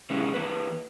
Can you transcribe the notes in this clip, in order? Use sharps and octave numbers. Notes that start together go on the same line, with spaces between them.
C3 E3 G#3 C#4
E3 A#3 B4